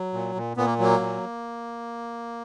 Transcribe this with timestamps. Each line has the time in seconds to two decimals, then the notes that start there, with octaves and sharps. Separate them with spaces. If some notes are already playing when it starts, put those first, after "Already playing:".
Already playing: F#3
0.13 A#2
0.35 A#2
0.57 A#2 B3
0.66 A#3
0.79 F#3 A#3
1.00 A#2